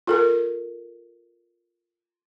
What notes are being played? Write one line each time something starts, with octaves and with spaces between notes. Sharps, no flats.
F4 A4 A#4